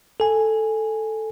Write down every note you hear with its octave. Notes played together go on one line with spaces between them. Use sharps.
A4 G#5